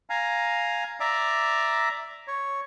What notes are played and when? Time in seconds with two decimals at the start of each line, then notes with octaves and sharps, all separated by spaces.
0.10 F5 G#5 A#5
1.00 D5 E5 A#5 D6
2.28 C#5